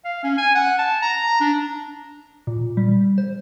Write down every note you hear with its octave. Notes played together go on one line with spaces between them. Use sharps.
F5
C#4
G#5
F#5
A5
A#5
D4
A#2
G3
C5